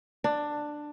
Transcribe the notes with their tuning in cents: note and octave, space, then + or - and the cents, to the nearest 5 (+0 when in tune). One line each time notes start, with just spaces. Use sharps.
D4 +10